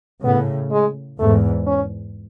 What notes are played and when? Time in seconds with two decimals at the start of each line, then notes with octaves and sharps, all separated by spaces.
0.24 A2 C#3 B3
0.71 G#3
1.19 E2 G#2 A3
1.66 C#4